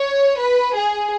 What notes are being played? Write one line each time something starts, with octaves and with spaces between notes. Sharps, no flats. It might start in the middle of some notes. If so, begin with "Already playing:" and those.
Already playing: C#5
B4
G#4